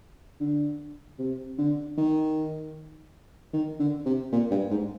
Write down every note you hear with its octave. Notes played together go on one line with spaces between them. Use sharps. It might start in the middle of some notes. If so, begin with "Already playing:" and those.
D3
C3
D3
D#3
D#3
D3
C3
A#2
G2
G#2